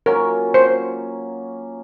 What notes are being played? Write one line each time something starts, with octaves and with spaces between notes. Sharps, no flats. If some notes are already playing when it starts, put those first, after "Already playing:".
F#3 A#3 C#4 F4 A#4
C5